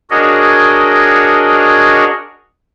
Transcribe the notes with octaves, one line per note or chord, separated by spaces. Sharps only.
D4 F#4 G#4 A#4 C#5 D#5